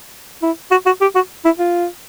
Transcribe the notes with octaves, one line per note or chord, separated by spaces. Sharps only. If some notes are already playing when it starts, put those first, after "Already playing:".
E4
F#4
F#4
G4
F#4
E4
F4